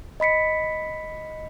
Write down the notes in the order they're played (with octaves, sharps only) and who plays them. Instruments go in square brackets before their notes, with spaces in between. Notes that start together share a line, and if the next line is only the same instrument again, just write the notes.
[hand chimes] D#5 B5 B6 C#7